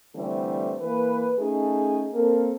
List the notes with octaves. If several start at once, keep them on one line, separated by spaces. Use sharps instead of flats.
D3 E3 G3 A3 C4
E3 A#3 B4
A3 C#4 D#4 G#4
A#3 C4 A4 A#4